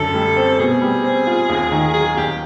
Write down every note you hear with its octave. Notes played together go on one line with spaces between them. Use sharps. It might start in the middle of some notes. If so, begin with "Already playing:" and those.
Already playing: F#2 D3 A4
G3
C4
B2 G#4
G3
C4
F4
D#2
D#3
F#3 G#4
D#2 G4